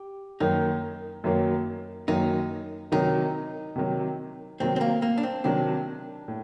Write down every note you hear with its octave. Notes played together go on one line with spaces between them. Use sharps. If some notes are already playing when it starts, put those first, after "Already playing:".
Already playing: G4
F#2 D#3 F#3 A#3 D#4
F#2 D#3 F#3 A#3
F#2 D#3 F#3 A#3 D#4
C3 D#3 F#3 D#4
C3 D#3 F#3
C3 D#3 F#3 C4
C4
A#3
A#3
D4
C4
C3 D#3 F#3 D4
A2